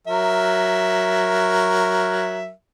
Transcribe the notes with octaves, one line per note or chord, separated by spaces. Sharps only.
F#3 A#4 E5